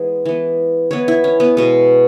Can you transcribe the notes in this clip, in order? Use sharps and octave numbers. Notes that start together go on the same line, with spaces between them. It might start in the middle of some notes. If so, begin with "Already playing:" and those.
Already playing: E3 G#3 B3
E3 B3
E3 B3 C#5
E4
C#4
B3
B2 G#3 B3